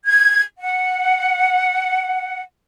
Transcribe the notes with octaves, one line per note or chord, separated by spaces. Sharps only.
G#6
F#5